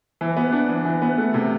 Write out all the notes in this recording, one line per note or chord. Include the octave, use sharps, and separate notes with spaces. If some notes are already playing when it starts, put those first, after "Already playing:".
E3
B3
D4
E3
E3
B3
A3
C3